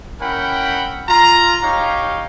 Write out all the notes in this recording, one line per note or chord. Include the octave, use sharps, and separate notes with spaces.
C#4 E4 A#4 F#5 G5 B5
F4 A#5
D#4 G4 C#5 F5